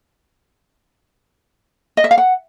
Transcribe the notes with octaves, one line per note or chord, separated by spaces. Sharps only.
D#5
E5
F5
F#5